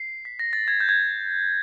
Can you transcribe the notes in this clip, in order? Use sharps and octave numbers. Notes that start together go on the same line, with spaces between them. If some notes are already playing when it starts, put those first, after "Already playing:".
Already playing: C7
B6
A#6
A6
G#6
G6
G#6